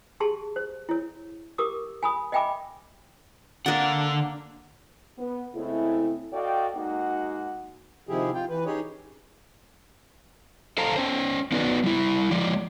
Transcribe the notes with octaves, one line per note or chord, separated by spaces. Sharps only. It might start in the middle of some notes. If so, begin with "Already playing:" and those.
G4 G#4 A5 C6
C5
E4 C#5
G4 A#4 D6 D#6
G#5 B5 D#6
D#5 E5 G5 G#5 B5 D6
D3 A#3 D4 F#5
B3
C#3 G#3 A3 C4 E4
F#4 A4 D5 D#5 F5 G5
G#3 A#3 D#4 F#4 F#5
C3 D#3 F3 E4 G4 G#4
F4 G5
E3 B4
C#4 D#4 G4 G#4 C#5
A4 C5 F5 A5 A#5
C#4 C5
B3 D#4 F#4 B4 D5
G3 E4
F3 G#3 D5